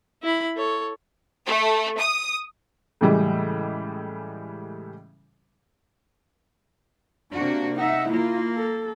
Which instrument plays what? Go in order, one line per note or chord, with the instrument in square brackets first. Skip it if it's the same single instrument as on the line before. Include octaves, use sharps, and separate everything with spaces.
[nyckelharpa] E4 B5
A4 C#5
[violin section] A3
D#6
[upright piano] A2 C#3 E3 G3 G#3
[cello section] C3 A#3 F#4 [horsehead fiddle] D4
[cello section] D#4 [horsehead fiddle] E5 F#5
[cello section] A#3 [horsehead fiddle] E4 F4
[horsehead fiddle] A4